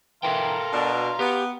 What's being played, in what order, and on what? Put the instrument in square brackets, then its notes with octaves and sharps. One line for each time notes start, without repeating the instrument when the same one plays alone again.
[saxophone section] E3 [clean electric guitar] A4 A#4 G5 [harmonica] F5 A#5 C6
[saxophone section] B2 D4
[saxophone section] B3 [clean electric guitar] G4